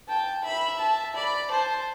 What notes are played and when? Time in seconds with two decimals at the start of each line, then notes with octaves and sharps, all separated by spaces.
0.09 G5 A5
0.44 E5 B5
0.80 A5
1.15 D5 B5
1.51 C5 A5